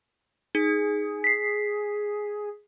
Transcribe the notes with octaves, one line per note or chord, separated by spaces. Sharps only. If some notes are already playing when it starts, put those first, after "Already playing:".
D#4 G#4
B6 C7